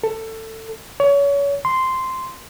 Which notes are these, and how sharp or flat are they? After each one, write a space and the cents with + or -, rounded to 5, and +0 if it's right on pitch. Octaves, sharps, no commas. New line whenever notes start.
A4 +20
C#5 +30
C6 -5